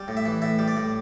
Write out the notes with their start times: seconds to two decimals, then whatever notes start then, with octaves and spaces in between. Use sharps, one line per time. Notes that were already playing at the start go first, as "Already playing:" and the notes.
Already playing: G3
0.08 A2
0.17 E5
0.25 E3
0.42 A2 E5
0.59 G3
0.68 D5
0.77 A2